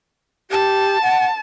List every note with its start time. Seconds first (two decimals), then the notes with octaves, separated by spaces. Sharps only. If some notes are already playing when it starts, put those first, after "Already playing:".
0.51 G4 A5
1.02 F#5